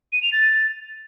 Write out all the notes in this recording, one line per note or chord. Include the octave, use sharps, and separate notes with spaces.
D#7
F7
A6